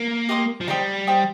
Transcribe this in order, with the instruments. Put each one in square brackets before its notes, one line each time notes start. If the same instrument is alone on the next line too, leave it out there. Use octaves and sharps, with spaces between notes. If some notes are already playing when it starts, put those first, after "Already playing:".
Already playing: [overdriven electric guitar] A#3
[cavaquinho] G4 D#5 C6 D#6
[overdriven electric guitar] F3
[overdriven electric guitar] G3 [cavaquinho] D#4 C5 G5 D#6
[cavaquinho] D#4 C5 G5 D#6